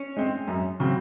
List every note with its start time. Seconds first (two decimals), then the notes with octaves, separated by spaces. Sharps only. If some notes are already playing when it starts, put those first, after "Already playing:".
Already playing: C#4
0.17 G#3 C4
0.48 F#2
0.80 C#3 F#3 C4